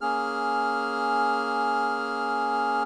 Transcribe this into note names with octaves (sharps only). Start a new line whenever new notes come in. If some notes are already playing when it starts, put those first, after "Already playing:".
A#3 C#4 G#4 F6